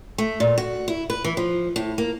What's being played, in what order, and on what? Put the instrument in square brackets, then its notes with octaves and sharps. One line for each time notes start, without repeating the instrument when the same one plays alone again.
[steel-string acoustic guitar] A3
A#2
F#4
E4
B4
E3
F3
A2
A#3